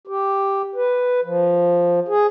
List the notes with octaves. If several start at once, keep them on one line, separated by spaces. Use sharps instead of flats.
G4
B4
F3
G#4